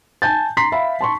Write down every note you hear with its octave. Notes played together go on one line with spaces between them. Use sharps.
G#5 A5 G6 A6
A#5 C6 B6 C7
E5 F5 B5
A5 C6 C#6